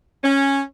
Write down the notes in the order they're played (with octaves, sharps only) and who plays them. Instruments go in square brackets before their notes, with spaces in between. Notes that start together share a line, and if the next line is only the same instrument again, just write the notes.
[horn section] C#4